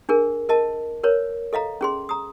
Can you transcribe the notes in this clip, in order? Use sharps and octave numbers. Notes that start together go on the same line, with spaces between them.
D4 G#4 A#4
A#4 D#5 A5
A#4 B4 C#5
A4 D#5 F5 A#5
C#4 G#4 C6
A#5 D#6